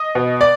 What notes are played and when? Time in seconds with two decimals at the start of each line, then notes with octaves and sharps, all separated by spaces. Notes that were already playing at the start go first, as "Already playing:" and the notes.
Already playing: D#5
0.15 B2
0.41 D5